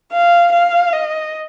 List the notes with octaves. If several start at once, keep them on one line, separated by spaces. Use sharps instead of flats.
F5
F5
D#5